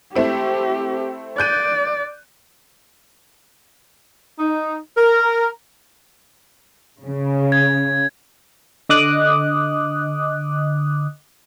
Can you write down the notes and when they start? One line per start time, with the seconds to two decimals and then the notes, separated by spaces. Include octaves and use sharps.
0.15 A3 C4 E4 G4
1.38 D5 F#6 G6 D#7
4.39 D#4
4.97 A#4
7.03 C#3
7.52 G#6
8.89 D3 D#5 D6 D#6 F#6